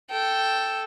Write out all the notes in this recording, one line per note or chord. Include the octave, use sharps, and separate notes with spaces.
A4 G5